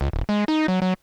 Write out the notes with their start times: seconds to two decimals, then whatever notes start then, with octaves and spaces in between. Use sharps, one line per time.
0.01 C#2
0.13 D1
0.29 G#3
0.48 D#4
0.68 F#3
0.82 F#3